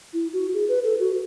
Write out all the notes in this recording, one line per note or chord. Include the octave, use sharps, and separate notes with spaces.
E4
F#4
G#4
B4
A4
F#4